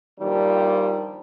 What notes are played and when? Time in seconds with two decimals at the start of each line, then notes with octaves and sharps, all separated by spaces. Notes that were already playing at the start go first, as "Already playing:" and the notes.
0.20 G2 A#2 D#3 F3 G3